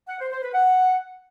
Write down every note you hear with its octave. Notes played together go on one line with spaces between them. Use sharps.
F#5
C5
C5
B4
F#5